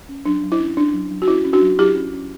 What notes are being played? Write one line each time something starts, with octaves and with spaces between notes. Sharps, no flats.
C#4
F#3 D4
F#3
E4
C#4
C#4 D4
F#3
F#3
F#4
C#4 E4
C#4
D4 F#4
F#3
F#3 E4 G4
C#4
C#4